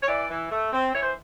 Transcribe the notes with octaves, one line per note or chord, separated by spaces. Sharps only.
C#5
E3 D5
E3
A3
C4
E3 C#5
C5